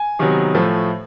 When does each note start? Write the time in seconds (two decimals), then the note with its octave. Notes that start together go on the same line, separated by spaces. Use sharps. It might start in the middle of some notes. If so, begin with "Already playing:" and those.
Already playing: G#5
0.19 C3 D#3 F#3 B3
0.54 A2 F3 A3